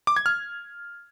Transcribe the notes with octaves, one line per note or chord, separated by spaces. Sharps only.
D6
G#6
F6